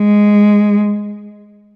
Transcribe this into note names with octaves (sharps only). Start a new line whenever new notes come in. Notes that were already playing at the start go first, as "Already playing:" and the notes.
Already playing: G#3